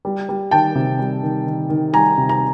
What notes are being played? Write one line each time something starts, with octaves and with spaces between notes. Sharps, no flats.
G3
G3
D#3 G5 A5
C3
G3
D#3
D#3
D#3
G3 G#5 A#5
C3
A#5